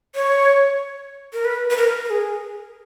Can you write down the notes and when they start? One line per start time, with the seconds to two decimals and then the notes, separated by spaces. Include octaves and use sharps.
0.15 C#5
1.33 A#4
1.45 B4
1.70 B4
1.77 A#4
2.05 A#4
2.10 G#4